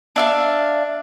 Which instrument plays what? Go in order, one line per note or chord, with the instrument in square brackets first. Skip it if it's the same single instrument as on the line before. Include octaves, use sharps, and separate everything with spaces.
[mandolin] D4 E5 F5